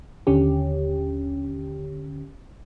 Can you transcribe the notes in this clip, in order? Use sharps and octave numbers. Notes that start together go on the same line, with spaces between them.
D#2 D3 C#4 G4